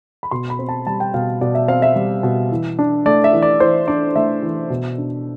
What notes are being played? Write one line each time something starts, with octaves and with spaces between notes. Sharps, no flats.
B5
B2 C6
B5
C4
A5
G3 A5
G5
B2 F5
B2 D5
E5
C4 F5
E5
G3
B2
E3
D4
A3 D5
E5
E3
D5
E3 C5
D4 D5
A3 E5
E3
B2
D4